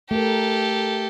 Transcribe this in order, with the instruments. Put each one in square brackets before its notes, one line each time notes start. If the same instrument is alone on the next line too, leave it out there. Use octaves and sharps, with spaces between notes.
[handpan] A3 A#4 [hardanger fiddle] G4 A4